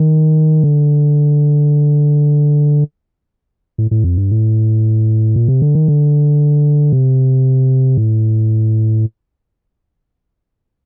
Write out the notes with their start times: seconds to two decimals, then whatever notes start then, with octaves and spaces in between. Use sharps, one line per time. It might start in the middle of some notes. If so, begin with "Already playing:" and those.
Already playing: D#3
0.64 D3
3.78 A2
3.91 A2
4.04 F2
4.18 G2
4.31 A2
5.36 A#2
5.48 C3
5.62 D3
5.75 D#3
5.88 D3
6.93 C3
7.97 A2